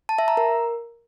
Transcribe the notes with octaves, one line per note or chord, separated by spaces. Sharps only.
A5
E5
A#5
A#4